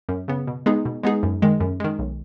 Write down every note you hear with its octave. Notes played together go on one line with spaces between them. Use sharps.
F#2
C#3 B3
B2
G#3 B3 D#4 G#4
B2
G#3 B3 D#4 G#4
F#2
D#3 G#3
F#2
D#3 G#3
B1